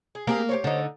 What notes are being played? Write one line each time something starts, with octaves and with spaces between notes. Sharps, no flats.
G#4
A#3 C4 G4 G#4
G4 C5 C#5
D3 D#4